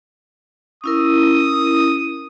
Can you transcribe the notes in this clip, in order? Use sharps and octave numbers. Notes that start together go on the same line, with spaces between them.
C#4 E4 A#4 D#6